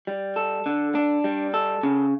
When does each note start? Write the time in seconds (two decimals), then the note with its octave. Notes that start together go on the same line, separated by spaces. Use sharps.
0.07 G3
0.36 A4
0.66 D3
0.95 D4
1.24 G3
1.54 A4
1.83 C#3